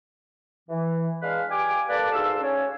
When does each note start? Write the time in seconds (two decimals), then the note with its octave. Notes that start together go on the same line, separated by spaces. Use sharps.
0.69 E3
1.22 G#3 D4 B4 F5
1.51 G4 G#5 D6
1.89 A#3 A4 B4 D5
2.12 D2 G#2 F5 A5 C6 E6
2.42 C#4 C#5